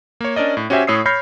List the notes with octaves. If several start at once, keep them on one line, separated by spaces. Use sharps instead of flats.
A#3 C#5
C#4 D4 A#4 D5 D#5
A2
C#4 F#4 G4 C5 E5 G#5
A2 C#5 D#6 E6 C7
C#5 B5 F6 G6 A#6 C7